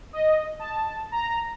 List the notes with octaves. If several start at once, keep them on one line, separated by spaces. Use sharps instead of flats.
D#5
A5
A#5